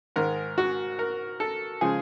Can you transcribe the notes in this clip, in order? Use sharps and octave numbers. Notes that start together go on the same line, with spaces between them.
G#2 D#3 G#3 A#4
F#4
A#4
A4
C#3 F3 G#3 G#4